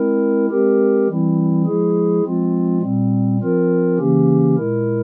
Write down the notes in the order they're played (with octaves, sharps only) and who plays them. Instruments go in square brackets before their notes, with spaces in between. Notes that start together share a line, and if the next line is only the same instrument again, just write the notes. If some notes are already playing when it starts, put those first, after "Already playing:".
Already playing: [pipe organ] G#3 C4 E4 A#4
G#3 C4 G4 A#4
E3 G3 C4 E4
F3 G#3 E4 G#4
F3 G#3 C4 F4
A#2 G3 C4
F3 C4 F4 A#4
C#3 E3 A#3 C#4 G4
A#2 G#3 E4 A#4